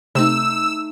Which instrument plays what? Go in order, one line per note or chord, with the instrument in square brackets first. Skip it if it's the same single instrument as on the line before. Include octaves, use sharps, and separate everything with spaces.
[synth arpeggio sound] C3 [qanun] A3 D#4 [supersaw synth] E6